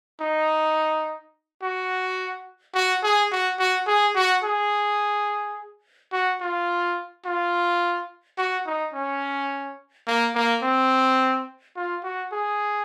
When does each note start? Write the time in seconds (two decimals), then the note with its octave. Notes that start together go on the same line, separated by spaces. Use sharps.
0.21 D#4
1.63 F#4
2.75 F#4
3.03 G#4
3.32 F#4
3.59 F#4
3.87 G#4
4.15 F#4
4.43 G#4
6.12 F#4
6.41 F4
7.25 F4
8.38 F#4
8.66 D#4
8.94 C#4
10.07 A#3
10.35 A#3
10.62 C4
11.76 F4
12.03 F#4
12.32 G#4